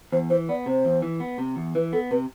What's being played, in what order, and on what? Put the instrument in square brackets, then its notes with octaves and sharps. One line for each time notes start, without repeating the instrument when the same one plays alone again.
[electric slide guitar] E2 [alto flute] C5
[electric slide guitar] E3 [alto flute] C5
[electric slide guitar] B3 [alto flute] D5
[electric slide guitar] C3 [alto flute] C5
[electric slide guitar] E2
E3
B3
C3
E2
[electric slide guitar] E3 [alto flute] B4
[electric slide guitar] B3 [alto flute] A4
[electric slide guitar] C3 [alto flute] B4